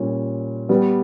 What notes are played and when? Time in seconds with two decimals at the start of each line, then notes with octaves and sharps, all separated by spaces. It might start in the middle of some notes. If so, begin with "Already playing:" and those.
Already playing: A#2 G3 C#4
0.69 G3 B3 G4